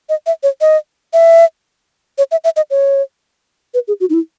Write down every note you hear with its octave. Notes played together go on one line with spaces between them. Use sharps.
D#5
E5
C#5
D#5
E5
C#5
E5
E5
D#5
C#5
B4
G#4
F#4
D#4
E4